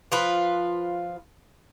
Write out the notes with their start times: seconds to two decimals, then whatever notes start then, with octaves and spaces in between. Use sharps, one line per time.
0.12 F3 F4 B4